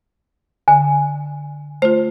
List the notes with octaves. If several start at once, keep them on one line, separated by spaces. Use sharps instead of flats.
D3 G#5
A3 F4 C5